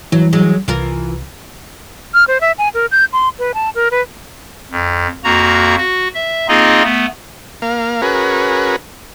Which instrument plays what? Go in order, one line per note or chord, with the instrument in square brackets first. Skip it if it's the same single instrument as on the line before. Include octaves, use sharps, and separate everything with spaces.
[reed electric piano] E3 [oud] F#3
[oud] F#3 G#3
[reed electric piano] C2 [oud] E3 F4 A#4
[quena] F6
C5
E5
G#5
A#4
G6
C6
B4
A5
A#4
B4
[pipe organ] F2
F2 A#3 F#4 A#5
F#4
E5
A#3 C4 D#4 F4 G#4 D#5
A3 B3
[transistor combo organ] A#3 F5
C#4 F#4 G#4 A#4 B4